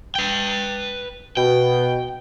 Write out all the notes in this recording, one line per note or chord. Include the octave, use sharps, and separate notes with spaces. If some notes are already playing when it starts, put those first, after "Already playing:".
B4 G5
B2 G5